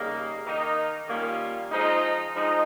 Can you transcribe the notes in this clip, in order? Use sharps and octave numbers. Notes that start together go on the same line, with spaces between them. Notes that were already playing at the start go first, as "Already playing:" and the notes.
Already playing: C#3 G3 A#3 D#4
D#3 A#3 D#4
D#3 G3 A#3 C#4 F4
F3 G#3 D#4
F3 G#3 D#4